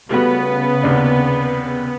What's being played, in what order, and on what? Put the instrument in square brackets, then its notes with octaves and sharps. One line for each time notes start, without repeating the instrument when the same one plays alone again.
[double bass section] C#3 [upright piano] G3 A3 F#4 [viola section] B3
[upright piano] D#2 C3 D4